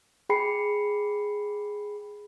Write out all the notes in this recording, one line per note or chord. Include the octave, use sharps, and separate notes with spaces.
G#4 G5 B5 C7 C#7